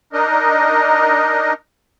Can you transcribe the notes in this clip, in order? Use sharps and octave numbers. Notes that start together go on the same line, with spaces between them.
D4 D#4 A#4 D#5